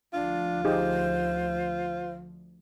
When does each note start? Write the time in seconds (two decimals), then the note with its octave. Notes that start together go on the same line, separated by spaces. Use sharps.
0.13 D2 F3 D4 F4
0.65 D#4 G4 G#4 C5